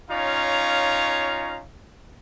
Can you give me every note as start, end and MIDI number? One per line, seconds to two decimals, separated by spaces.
0.10 1.61 61
0.10 1.61 63
0.10 1.61 65
0.10 1.61 73
0.10 1.61 77
0.10 1.61 82